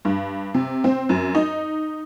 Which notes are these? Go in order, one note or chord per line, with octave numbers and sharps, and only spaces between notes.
G2
C3
C4
F#2
D#4